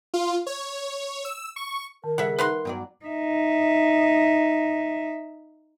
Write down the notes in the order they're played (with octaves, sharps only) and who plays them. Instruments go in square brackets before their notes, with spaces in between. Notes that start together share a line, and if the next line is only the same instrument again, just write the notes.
[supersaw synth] F4
C#5
E6
C#6
[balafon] D#3 [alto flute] A#4
[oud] C#3 G#4 [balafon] G3 A4 [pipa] E5 F#5
[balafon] D#4 E5 [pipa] B4 F#5 C6
[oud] G2 F#3 D5 [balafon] B3 G5
[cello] D#4 E5